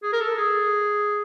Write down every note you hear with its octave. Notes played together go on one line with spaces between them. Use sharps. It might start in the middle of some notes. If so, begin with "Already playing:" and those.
G#4
A#4
A4
G#4